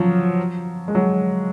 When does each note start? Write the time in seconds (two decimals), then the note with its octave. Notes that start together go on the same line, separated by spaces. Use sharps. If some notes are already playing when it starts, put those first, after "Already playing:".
Already playing: F3 F#3
0.88 G#3
0.95 F#3